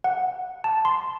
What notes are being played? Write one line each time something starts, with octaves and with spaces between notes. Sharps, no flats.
F#5
A5
C6